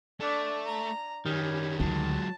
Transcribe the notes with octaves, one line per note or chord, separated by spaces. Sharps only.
A3 D4
A#5
F#2 D#3 G3 C#4
D2 F#3 G#3 A5